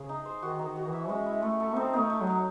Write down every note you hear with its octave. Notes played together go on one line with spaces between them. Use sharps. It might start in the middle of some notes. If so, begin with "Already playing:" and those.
Already playing: C#3 G#4
D#4
C5
D#3 F#4
D#4
D#3
F#4
E3
E5
G#3 C#4
E4
A3 A4
A4
C4 D#4
A3 D#4
D#4
F#3
D#4